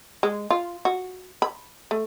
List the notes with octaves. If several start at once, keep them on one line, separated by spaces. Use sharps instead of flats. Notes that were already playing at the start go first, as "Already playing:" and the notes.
G#3
F4
F#4
B5
A3